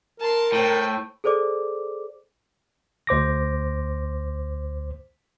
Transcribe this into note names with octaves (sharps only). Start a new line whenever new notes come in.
A#4 A5 C6
A2 C5 G5
G#4 A4 C5 D5 D6
D2 C5 D6 A#6